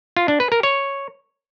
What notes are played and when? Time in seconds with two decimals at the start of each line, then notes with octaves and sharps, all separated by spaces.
0.17 F4
0.28 D4
0.40 B4
0.52 A#4
0.63 C#5